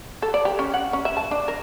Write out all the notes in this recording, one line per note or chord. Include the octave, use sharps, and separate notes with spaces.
A4
D5
G4
C#4
F#5
C#4
E5
A5
D4
A#4